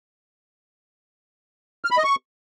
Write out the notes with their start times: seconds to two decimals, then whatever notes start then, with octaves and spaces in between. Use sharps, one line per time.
1.85 F6
1.91 B5
1.97 D#5
2.04 C#6